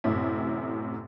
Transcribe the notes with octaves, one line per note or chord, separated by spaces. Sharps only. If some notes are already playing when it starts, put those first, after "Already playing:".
A1 F#2 A2 C3 E4